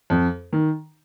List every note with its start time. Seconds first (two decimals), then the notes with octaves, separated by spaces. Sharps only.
0.10 F2
0.53 D#3